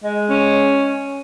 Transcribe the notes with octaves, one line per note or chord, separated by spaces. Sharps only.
G#3
C#4